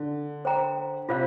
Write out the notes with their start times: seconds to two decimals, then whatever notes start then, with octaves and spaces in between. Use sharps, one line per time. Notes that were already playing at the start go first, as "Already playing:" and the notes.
Already playing: D3
0.45 C5 G5 A#5
1.09 C3 F4 C5 F5